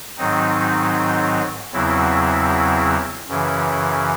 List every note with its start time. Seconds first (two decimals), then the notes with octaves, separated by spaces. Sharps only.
0.18 G#2 D#3 F#3 C4 D#4
1.73 E2 C#3 F#3 C4 E4
3.28 F#2 C#3 E3